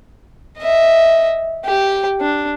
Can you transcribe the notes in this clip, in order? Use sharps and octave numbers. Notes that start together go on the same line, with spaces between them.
D#5 E5
G4 G5
D4